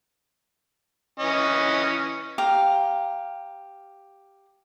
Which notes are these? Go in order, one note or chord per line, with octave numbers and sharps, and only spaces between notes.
E3 C#4 D#5
G4 F5 A#5